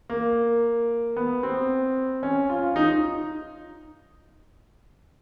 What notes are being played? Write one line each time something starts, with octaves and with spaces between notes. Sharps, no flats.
A#3
B3
C4
C#4
F4
D#4